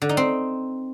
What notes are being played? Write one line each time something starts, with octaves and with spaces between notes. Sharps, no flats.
D3
D#4
C4